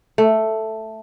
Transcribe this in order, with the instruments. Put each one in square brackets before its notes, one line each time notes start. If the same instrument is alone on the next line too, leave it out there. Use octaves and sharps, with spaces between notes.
[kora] A3